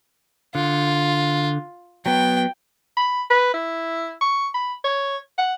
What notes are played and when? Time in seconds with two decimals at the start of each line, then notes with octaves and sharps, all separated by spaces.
0.55 D3 F4
2.06 F#3 B3 G5
2.97 B5
3.30 B4
3.54 E4
4.21 C#6
4.54 B5
4.84 C#5
5.38 F#5